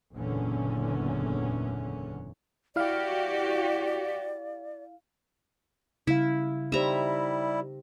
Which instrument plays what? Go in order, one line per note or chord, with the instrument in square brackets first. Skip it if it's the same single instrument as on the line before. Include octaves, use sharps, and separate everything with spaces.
[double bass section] F#1 E2 A#2 D3 C#4
[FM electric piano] E4 F5 [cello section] F#4 G4 [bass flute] D5
[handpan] C#3 G3 F5 [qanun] E4
[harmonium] G3 E4 [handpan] D#4 G4 C5 [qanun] E5 A#5